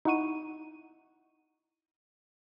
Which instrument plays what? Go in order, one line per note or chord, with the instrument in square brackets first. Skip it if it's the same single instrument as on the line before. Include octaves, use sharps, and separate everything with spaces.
[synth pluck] D#4 E4 F#5 C#6 D#7